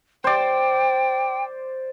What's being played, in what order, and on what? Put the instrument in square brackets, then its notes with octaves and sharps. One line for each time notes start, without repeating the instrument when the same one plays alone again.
[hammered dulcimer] C5 D5 [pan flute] G5